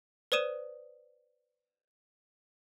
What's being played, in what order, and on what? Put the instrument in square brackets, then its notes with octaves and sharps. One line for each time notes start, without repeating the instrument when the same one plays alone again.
[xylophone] B4 C5 D5 D#6 D#7 E7